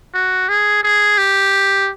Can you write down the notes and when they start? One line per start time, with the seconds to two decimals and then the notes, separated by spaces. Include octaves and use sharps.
0.14 F#4
0.49 G#4
0.83 G#4
1.18 G4